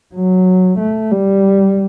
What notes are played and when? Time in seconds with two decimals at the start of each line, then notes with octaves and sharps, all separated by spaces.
0.14 F#3
0.79 A3
1.11 G3